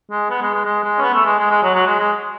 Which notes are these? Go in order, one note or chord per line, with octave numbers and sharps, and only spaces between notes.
G#3
B3
G#3
G#3
G#3
G#3
C#4
B3
A3
G#3
G#3
G#3
F#3
F#3
G#3
G#3